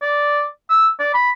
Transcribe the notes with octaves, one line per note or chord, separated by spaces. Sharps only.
D5
E6
D5
B5